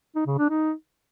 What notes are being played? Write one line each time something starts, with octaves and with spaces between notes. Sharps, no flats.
D#4
C#3
D4
D#4